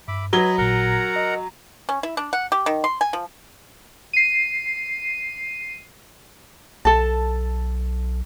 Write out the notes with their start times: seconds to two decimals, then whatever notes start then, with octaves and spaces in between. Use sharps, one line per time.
0.08 G2 E5 B5 D6
0.33 F#3 B4 D#5 B5 G#6 G7
0.58 A1 A#2 A#4 F#5 A#5
1.16 D#5
1.89 C#4
2.03 E4
2.17 D4
2.33 F#5
2.52 G4
2.66 D#3
2.84 C6
3.01 G#5
3.13 F3
4.13 C7 D#7
6.85 B1 A4 A5